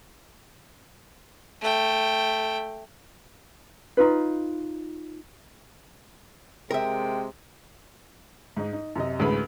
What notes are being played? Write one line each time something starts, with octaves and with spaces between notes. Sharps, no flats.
A3 G5
D#4 F4 B4
C3 G#3 A#4 E5 G5
G#2 D#4
D#4
F#2 C3 D#5
A1 D2 G#3 B4 B5